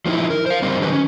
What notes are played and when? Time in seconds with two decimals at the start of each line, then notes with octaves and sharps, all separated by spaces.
0.06 F3 A#3 C4 D#4 E4
0.30 A#4
0.46 C5 F5
0.62 G3 C4 D#4 A#4 C5
0.81 D3 D#3 F3 F#3 B4
0.92 C#4